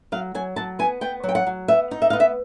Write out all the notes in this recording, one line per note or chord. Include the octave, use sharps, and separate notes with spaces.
F#3 F5
F#3 G#5
F#3 A5
B3 G#5
B3 G5
F#3
G5
F#5
F#3
B3 E5
D#4
E5
B3 F5
E5